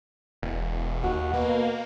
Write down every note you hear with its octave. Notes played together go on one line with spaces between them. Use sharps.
E1
D#2 F#4
B2 A#3